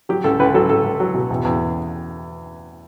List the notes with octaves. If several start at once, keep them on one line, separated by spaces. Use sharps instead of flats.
F#3 G4
C#2 A4
C#2 B4
F#3 A4
C#2 A4
C#2
F#3
B2
E2
E2